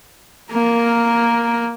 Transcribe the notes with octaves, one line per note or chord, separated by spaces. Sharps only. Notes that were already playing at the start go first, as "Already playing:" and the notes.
A#3 A#4